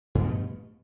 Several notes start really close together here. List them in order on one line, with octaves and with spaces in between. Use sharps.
G2 F3 B2 A3